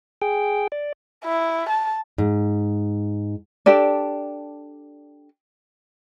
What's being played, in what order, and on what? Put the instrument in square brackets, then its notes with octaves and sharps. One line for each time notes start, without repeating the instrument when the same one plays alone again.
[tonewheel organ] G#4 G5
D5
[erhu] E4
A5
[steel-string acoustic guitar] G#2
[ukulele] D4 G4 A4 D5